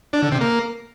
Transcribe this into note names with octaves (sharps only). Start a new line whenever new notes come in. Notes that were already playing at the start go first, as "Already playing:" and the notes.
D4
D3
C3
A#3